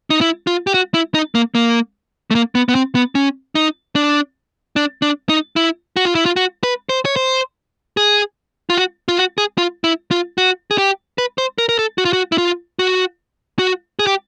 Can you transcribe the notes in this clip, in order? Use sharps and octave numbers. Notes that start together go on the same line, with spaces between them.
D#4
E4
F4
G4
F#4
E4
D#4
A#3
A#3
A3
A#3
B3
B3
C4
B3
C#4
D#4
D4
D4
D4
D#4
E4
F#4
F4
E4
F4
F#4
B4
C5
C#5
C5
G#4
F4
F#4
F4
F#4
G#4
F4
E4
F4
F#4
G#4
G4
B4
C5
A#4
A#4
A4
F#4
F4
F#4
E4
F4
F#4
F#4
G#4
G4